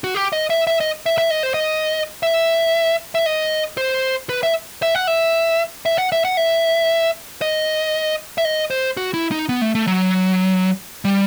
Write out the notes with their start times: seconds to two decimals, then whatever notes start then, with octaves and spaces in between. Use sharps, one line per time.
0.04 F#4
0.15 G4
0.33 D#5
0.50 E5
0.67 E5
0.80 D#5
1.06 E5
1.18 E5
1.31 D#5
1.43 C5
1.54 D#5
2.23 E5
3.15 E5
3.26 D#5
3.78 C5
4.29 B4
4.43 E5
4.82 E5
4.95 F#5
5.07 E5
5.86 E5
5.98 F#5
6.12 E5
6.25 F#5
6.37 E5
7.42 D#5
8.38 E5
8.45 D#5
8.71 C5
8.97 F#4
9.14 E4
9.32 D#4
9.49 B3
9.62 A3
9.75 A3
9.87 F#3
11.05 G3